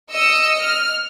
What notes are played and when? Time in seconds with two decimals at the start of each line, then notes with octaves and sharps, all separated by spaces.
0.11 D#5 E6 C#7
0.61 F6